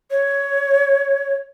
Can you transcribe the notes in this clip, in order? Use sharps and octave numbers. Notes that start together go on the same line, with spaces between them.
C#5